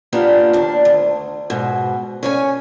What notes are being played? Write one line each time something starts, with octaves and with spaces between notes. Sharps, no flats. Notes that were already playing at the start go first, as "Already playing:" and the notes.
A#3 B3 D4 F4 G4
D#2 D4
D2
G#2 B2
C#4 C#5 G#5